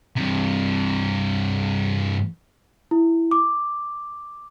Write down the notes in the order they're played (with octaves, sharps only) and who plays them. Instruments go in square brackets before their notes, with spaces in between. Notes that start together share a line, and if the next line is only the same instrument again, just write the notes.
[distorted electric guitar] G2 C3
[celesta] E4
D6